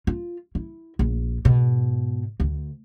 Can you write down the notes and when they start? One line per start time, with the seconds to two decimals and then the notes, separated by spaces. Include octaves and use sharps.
0.07 F4
0.55 E4
0.99 A#1
1.45 G#2 B2
2.40 D2